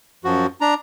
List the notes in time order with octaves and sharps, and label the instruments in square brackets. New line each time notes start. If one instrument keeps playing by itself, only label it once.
[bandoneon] F#2 F3 F#4
D4 A#5